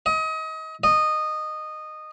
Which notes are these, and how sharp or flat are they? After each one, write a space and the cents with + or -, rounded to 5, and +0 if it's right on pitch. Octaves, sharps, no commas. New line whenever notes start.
D#5 +30
D#5 -15